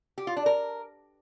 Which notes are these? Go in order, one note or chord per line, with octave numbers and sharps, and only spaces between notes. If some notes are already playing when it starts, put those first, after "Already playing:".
G4
F4
D4
A#4